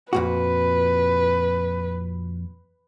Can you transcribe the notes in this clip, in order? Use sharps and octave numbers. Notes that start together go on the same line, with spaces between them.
F2 A#2 F#4 B4